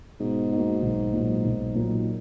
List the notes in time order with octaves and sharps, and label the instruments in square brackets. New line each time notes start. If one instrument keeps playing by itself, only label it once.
[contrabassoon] G#2 [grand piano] B2
[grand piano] A#3 D#4 F#4
B1
A#2 F#3 A#3 D#4
B1
A#2 F#3 A#3 D#4